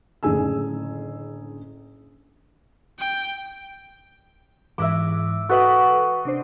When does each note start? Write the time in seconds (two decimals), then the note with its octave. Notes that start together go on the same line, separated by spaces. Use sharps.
0.23 F#1 A2 D3 G#4 G#5 E6
2.99 G5
4.78 G#2 E3 E5 D6
5.49 F#4 A4 B4 D#5 F#5
6.25 C3 D4 C5